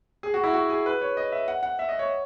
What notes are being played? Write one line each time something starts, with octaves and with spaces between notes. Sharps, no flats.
G#4
F#4
E4
F#4
G#4
B4
C#5
D#5
E5
F#5
F#5
E5
D#5
C#5